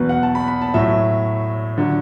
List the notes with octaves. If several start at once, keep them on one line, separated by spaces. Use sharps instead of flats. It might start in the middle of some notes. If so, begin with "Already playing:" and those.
Already playing: E2 B2 F#3 B4
F#5
A5
B5
B5
A5
A2 F#3 E5
D3 F#3